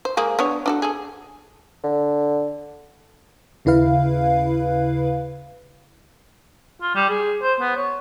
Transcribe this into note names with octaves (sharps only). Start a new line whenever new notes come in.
C5
G#3 A#3 G#4
B3 D4 C#5
D4 F#4 A4
G#4 A4
D3
D#2 C#3 E4 B4 F5
F4
G3
G#4
C5
B3
C#5